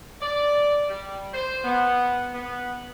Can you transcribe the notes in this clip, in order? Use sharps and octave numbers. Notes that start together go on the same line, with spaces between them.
D5
G3
C5
B3
B3